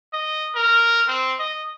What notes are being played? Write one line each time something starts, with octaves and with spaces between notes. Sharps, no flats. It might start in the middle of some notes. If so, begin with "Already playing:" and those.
D#5
A#4
C4
D#5